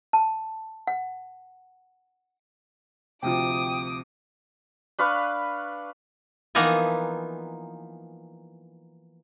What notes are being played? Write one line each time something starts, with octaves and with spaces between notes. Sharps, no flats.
A5
F#5
D2 C3 F3 G5 D6 D#6
D4 B4 F5 C#6
E3 F3 A#3 B3 D#4 G#5